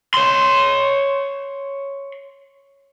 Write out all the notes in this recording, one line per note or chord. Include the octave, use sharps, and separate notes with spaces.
C#5 C6